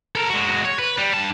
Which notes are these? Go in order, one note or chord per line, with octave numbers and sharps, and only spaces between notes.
A4 A#4
G#3 F#4
C#5
B4
G3
G2 A5